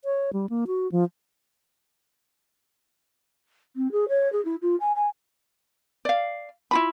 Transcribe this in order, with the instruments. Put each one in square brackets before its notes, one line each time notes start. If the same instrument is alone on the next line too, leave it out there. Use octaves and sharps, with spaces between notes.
[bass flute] C#5
G3
A#3
F#4
F3
[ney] C4
G#4
C#5
G#4
E4
F4
G#5
G#5
[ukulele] D5 F5
E4 F4 B5